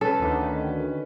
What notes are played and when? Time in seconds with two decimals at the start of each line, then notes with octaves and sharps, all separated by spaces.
0.01 C#4 A4 B4
0.20 D2 D3 D#3